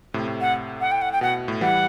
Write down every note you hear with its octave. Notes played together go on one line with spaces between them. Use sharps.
A2 C3
A2
F#5
F#5
G5
F#5
G5
B2 F#5
A2
E3 G3 F#5